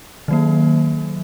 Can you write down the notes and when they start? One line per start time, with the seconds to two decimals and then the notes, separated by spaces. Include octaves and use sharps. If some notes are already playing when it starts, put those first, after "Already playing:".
0.28 D#3 F#3 A#3